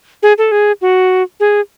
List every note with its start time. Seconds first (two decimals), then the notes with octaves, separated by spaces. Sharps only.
0.23 G#4
0.38 A4
0.52 G#4
0.81 F#4
1.40 G#4